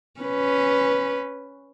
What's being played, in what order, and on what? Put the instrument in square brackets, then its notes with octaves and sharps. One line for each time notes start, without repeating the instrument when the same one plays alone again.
[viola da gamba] C#4 B4